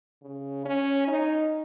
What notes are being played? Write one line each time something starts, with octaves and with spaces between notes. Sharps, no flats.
C#3
C#4
D#4